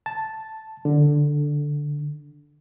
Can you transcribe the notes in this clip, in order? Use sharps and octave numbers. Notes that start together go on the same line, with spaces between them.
A5
D3